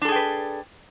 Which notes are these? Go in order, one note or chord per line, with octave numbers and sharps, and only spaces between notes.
D4 G#4 A4 B4 G5